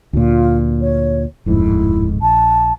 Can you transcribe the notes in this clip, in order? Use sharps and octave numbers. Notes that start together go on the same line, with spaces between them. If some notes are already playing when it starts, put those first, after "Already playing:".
D2 A#2 F4
C#5
D1 F2 G#2 E4
A#1 A5